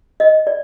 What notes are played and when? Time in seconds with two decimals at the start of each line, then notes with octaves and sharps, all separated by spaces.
0.20 D#5
0.47 D5